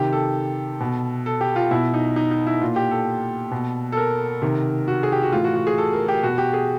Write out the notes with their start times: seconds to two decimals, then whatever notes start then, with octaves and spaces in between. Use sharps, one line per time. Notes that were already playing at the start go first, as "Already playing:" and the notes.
Already playing: C3 D#3 G4
0.13 A4
0.80 B2
1.26 A4
1.41 G4
1.56 F4
1.71 B2 E4
1.94 D#4
2.16 D#4
2.31 D#4
2.47 E4
2.61 A#2 F4
2.76 G4
2.91 A4
3.51 B2
3.92 A4
3.97 A#4
4.42 C3 D#3
4.88 F#4
5.03 G#4
5.12 G4
5.22 F#4
5.32 A2 E3 F4
5.44 F#4
5.55 F#4
5.67 G#4
5.78 A4
5.93 A#4
6.08 G4
6.23 B2 F#4
6.38 G4
6.53 G#4